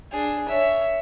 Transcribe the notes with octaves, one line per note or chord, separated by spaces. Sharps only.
D4 G#4
C#5 E5